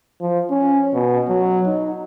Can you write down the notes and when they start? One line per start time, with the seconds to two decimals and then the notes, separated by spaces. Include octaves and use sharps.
0.21 F3
0.50 C#4
0.94 B2
1.29 F#3
1.66 D#4